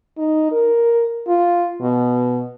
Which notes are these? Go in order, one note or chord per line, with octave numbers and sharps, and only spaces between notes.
D#4
A#4
F4
B2